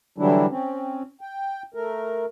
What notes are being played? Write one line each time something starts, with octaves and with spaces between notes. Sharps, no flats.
D3 E3 F#3 G3 D4 E4
C4 C#4
G5
A3 A#4